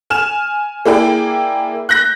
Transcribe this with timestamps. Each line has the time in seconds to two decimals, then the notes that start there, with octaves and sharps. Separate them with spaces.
0.10 G#5 F6 E7
0.86 A#3 E4 G#4 D5 G5
1.89 F#6 G6 A#6